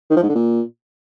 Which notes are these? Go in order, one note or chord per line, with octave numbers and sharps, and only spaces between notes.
D#3
F3
G#2
D3
A#2